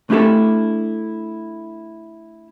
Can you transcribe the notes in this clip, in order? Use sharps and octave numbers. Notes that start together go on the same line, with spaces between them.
A3 D4 E4 G4 A4